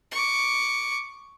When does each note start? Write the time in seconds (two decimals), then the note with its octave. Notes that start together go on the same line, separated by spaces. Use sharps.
0.11 C#6 D6